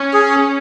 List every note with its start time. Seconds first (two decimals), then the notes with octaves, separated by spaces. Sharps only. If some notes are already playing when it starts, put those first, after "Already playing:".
Already playing: C#4
0.14 G#4